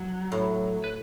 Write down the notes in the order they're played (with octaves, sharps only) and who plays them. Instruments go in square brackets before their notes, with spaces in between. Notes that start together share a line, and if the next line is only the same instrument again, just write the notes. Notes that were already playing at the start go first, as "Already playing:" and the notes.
Already playing: [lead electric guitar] F#3
[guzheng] A2
[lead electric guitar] B4